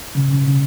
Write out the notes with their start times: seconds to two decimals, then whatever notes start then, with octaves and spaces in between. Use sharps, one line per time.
0.15 C#3
0.30 C#3
0.45 C#3